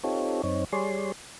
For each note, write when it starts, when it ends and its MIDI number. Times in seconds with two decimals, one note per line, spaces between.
0.04 0.42 60
0.04 0.42 63
0.04 0.42 65
0.04 0.42 67
0.04 0.42 69
0.04 0.42 73
0.43 0.65 42
0.43 0.65 60
0.43 0.65 63
0.43 0.65 73
0.73 1.12 55
0.73 1.12 68
0.73 1.12 73
0.73 1.12 74
0.73 1.12 84